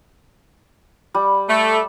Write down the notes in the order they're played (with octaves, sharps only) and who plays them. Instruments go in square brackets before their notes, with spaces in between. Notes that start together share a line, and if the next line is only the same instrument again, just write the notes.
[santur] G3
[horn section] A3